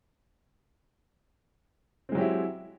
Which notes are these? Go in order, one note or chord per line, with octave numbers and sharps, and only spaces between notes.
F#3 G#3 C4 E4 G4